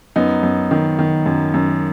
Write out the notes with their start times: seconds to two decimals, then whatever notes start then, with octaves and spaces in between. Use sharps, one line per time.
0.16 F#2 B3 D#4
0.43 F#2
0.71 D#3
0.99 D#3
1.26 F#2
1.54 F#2